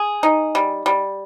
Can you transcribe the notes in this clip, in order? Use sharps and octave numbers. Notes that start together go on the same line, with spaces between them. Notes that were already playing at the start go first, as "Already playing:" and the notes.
Already playing: G#4
D#4
G3
G3